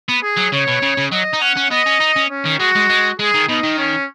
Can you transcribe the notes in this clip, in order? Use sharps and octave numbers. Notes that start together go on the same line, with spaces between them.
B3
G#4
F#3
C#3 C#5
B2
C#3
C#3
F#3 D#5
D#4
C#4 F#5
C#4
B3 D#5
C#4
D#4
C#4
C#4
D#3
G#3 F#4
G#3
G#3
G#3 G#4
D#3
B2 D#4
D#3
C#4